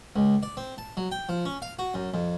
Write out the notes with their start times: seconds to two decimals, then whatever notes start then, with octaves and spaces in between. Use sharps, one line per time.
0.16 C#2
0.43 D5
0.57 C4
0.78 A5
0.97 F#3
1.12 G5
1.29 F3
1.45 C#4
1.62 F5
1.79 F#4
1.94 F#2
2.14 F2